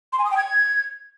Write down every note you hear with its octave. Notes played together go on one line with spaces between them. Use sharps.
C6
G#5
D#6
G5
G#6